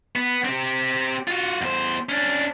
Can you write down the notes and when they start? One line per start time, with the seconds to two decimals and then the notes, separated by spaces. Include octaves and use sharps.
0.16 B3
0.44 C4 G4
1.28 F4 F#4
1.62 E2 C5
2.09 C#4 D4